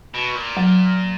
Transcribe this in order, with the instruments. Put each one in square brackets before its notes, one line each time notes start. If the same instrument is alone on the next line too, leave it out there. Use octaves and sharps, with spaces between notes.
[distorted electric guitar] B2
A#2
[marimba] F#3